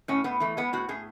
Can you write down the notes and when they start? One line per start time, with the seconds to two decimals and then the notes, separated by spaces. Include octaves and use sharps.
0.08 A2 C#4
0.24 A2 B3
0.40 E3 A3
0.57 G#3 B3
0.73 A2 F#4
0.89 A2 G#4